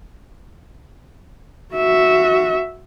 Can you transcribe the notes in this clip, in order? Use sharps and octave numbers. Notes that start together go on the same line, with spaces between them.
F#4 E5